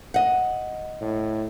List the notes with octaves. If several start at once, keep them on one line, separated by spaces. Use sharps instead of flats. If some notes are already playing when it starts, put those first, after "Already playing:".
D#5 F#5
A2